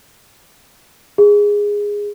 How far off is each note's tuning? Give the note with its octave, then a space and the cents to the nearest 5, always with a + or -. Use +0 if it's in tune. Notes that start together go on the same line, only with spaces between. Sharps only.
G#4 -10